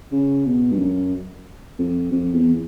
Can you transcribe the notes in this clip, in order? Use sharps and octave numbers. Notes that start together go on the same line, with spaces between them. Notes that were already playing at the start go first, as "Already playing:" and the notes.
C#3
B2
G2
F#2
F2
F2
E2